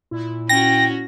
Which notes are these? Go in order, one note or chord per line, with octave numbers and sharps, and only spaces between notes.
A#2 E4
C#4 F#4 G5 A#6